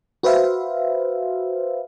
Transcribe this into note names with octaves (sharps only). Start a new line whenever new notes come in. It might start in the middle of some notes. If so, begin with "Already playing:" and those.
F#4 B4 C5 E5 F5